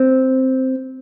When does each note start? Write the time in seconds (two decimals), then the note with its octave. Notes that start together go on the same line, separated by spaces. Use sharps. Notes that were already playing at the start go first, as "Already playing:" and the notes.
Already playing: C4